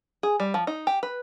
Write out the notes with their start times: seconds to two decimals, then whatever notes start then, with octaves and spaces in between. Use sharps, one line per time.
0.23 G#4
0.40 G3
0.54 F3
0.67 D#4
0.87 G4
1.03 B4